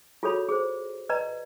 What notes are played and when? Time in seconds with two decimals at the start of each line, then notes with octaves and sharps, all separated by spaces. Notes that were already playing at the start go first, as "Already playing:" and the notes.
0.23 F4 F#4 G#4 A4 C#5 B5
0.49 G#4 C5
1.09 B4 D5 D#5 A#5